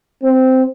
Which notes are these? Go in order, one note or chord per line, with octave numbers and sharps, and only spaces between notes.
C4